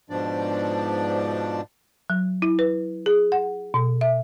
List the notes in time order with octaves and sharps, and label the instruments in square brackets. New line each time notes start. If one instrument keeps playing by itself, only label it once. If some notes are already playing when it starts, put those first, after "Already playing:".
[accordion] G#2 B2 F3 D4 D5
[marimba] F#3
E4
B4
G#4
F#5
B2
E5